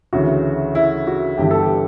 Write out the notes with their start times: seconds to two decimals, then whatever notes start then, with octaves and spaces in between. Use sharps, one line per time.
0.13 D2 C#3 E3 F#4
0.75 E4
1.07 F#4
1.38 G1 G2 E3 G4
1.51 A4
1.63 G4